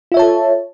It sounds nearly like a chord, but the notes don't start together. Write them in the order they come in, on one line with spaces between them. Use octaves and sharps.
F4 E5 C#5 A5 A4